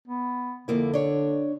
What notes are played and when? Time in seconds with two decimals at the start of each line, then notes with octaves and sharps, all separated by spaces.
0.08 B3
0.68 F2 D3 A#3 E4
0.93 D4 C#5